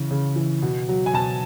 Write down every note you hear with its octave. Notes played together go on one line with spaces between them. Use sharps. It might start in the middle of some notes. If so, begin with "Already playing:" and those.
Already playing: C#3 E3
C#3
E3
B2
F#3
G#5
B2 A5